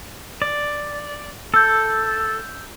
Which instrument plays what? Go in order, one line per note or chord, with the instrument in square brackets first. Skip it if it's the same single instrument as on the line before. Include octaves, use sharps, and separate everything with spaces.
[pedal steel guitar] D5
[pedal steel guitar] A4 [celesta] E6 G6